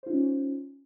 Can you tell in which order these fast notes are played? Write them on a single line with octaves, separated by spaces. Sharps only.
C5 F4 D#4 C#4